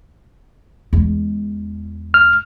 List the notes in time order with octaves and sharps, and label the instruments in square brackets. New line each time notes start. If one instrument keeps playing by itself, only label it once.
[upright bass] E2 G#3
[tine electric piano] F6